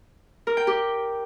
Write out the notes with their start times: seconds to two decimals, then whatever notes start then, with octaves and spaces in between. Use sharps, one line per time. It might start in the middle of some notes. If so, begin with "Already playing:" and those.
0.47 A#4
0.57 G5
0.67 G4